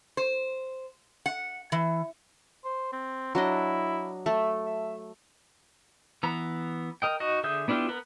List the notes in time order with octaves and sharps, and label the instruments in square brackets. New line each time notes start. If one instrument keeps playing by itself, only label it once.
[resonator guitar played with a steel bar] C5
F#5
E3
[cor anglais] C5
C4
[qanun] F#3 D4 D#5 [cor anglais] E4
[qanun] A3 [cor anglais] E5
[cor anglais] E5
[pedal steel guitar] E3 B3 A#5
A#4 D#5 G5
D#4 F#4 D#5
D3 G#4 E5 D#6 G6
B3 D4 E4 F4 G4
B3 A#4 B4